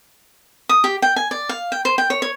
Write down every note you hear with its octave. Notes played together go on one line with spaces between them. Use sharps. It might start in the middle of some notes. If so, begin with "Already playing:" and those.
D#6
G4
G5
G#5
D5
F5
G5
C5
G5
C#5
C#5